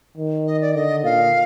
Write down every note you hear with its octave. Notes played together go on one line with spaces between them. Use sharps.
D#3
D#5
D5
D3 D#5
A#2 F5